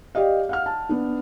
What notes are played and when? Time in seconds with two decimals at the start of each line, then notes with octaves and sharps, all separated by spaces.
0.15 G4 D5 D#5 F5
0.49 F5 F#5 F6
0.66 A5
0.89 B3 D4